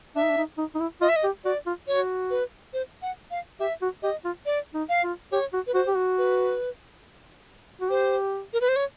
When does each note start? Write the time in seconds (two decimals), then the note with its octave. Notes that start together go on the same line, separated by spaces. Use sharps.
0.15 D4 E5
0.22 D#4
0.30 D4
0.37 D#4
0.58 D#4
0.75 D#4
0.80 E4
1.01 F4 D#5
1.09 E5
1.16 D#5
1.24 G4
1.45 F#4 D5
1.66 F4
1.87 F#4 C#5
2.30 B4
2.73 C5
3.02 F#5
3.31 F5
3.60 G4 E5
3.82 F#4
4.03 G4 D#5
4.24 F4
4.46 D5
4.74 D#4
4.89 F5
5.03 F4
5.32 G4 C#5
5.53 F#4
5.67 B4
5.74 F#4 C5
5.87 G4
5.97 F#4
6.18 B4
7.81 F#4
7.90 G4 C5
8.53 A#4
8.61 B4
8.69 C5
8.76 C#5